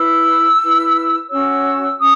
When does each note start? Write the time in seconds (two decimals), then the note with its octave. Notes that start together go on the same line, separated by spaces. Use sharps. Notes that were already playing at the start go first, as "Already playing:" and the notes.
Already playing: E4 B4 E6
0.61 E4 B4
1.29 C#4 F#4 C#5 E6
1.99 C#4 D#6